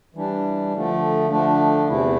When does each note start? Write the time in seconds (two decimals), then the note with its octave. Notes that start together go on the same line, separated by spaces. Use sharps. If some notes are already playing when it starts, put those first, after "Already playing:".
0.15 E3 G3 D4
0.73 D3 F3 A3
1.30 D3 F3 A3 D4
1.89 E2 C3 E3 A3 E4